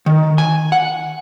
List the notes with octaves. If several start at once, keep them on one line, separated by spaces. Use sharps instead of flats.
D#3
G#5
F#5